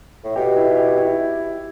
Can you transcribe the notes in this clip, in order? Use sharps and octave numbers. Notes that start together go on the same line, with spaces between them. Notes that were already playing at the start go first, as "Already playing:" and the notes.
A2
B2 G4
E4
G4
E4